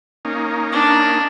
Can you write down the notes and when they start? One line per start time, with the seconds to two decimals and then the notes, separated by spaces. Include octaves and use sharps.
0.25 A#3 C#4 D#4
0.72 D4